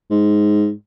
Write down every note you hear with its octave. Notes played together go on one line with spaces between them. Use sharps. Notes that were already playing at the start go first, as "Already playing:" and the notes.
G#2